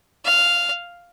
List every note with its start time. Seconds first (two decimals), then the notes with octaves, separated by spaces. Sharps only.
0.25 F5